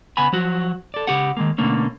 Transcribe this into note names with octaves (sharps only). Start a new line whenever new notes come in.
C#3 B3 F#5 G#5 B5
F3 F#3 F#4
A4 D5
C#3 G4 F#5
D#3 G#3 A#3
B2 D3 A3 A#3 C#4